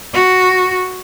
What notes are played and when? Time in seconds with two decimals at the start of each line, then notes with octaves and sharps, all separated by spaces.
0.14 F#4